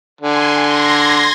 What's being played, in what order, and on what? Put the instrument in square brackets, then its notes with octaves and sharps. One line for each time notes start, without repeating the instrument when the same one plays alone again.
[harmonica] D3 [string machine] G#5 C6
[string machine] C6 G#6 A#6